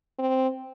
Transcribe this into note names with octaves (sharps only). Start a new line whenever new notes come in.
C4